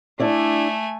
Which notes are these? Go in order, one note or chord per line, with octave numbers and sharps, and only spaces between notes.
A3 D4 E4 D5 G#5